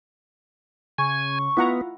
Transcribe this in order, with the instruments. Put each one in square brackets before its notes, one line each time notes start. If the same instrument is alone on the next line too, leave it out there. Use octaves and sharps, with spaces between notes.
[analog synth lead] C#3 [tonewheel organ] G#5 [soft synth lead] C#6
[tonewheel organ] B3 [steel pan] E4 F#5 A#5 [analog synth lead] F4